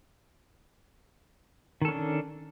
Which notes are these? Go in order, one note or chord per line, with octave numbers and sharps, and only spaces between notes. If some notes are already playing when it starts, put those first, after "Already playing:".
D#3 C#4 D4 A4